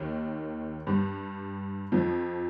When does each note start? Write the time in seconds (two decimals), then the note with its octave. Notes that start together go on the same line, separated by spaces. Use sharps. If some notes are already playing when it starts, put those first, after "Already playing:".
Already playing: D#2 D#3
0.87 G2 G3
1.92 F2 F3